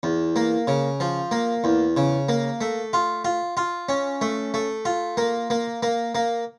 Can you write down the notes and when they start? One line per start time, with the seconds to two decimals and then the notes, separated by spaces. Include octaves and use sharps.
0.03 E2
0.36 A#3
0.67 C#3
1.00 F3
1.31 A#3
1.64 E2
1.97 C#3
2.29 A#3
2.61 A3
2.93 F4
3.25 F4
3.57 F4
3.89 C#4
4.21 A3
4.54 A3
4.85 F4
5.17 A#3
5.50 A#3
5.83 A#3
6.15 A#3